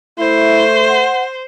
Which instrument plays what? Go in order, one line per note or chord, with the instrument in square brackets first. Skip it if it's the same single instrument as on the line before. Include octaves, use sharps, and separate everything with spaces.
[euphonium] A3 [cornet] E4 [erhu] C5
[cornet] F#5